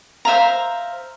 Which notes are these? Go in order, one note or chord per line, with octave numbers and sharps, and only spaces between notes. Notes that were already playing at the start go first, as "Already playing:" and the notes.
C5 E5 F5 A#5